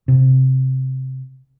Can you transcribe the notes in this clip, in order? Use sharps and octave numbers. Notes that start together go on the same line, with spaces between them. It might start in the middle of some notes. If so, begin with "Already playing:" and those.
C3